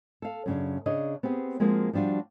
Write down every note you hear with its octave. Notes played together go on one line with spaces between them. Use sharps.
A4 F5
F#2 C#3 D4
C#3 D4 G#4 C#5 D#5
B3 C4 G4 G#4
F3 G#3 A#3 C4 F#4 G#4
F3 G3 D4 F4 F#4